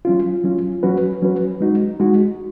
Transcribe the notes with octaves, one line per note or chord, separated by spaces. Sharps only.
F#3 C#4 F4
F#3 C#4 F4
F#3 C#4 F#4 B4
F#3 C#4 F#4 B4
G#3 D#4 F#4
G#3 D#4 F#4